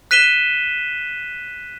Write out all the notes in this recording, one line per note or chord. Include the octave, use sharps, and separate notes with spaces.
F#6 B6 D#7 E7 G7